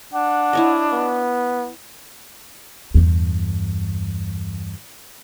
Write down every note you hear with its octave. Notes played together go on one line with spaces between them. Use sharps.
D4 F#5
E4 C#5 D#5
B3
E2 G2